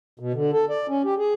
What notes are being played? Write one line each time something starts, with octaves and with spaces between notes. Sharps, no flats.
B2
D3
A4
D5
C#4
G4
G#4